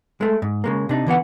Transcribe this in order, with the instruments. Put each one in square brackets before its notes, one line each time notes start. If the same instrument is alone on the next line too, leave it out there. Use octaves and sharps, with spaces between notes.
[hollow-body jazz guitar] G#3 A3
G#2
C#3 G#3 A#3
C3 D4 D#4
D3 E3 B3 F#5